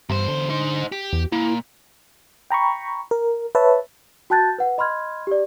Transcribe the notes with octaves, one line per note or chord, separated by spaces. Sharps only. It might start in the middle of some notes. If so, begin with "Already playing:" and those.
E2 G2 C5
D3
D#4 C5
G4
E2
A#2 E4
G5 A#5 B5 C#6
A#4
B4 C#5 E5 A5
F#4 G5 A5 F#6 G6 A6
B4 F#5
D#5 B5 C6 F6 G#6
G4 D5